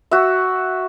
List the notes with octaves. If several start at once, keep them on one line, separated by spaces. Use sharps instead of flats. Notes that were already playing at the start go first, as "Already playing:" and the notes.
F#4 E5